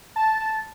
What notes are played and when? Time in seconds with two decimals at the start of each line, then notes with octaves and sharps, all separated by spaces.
0.16 A5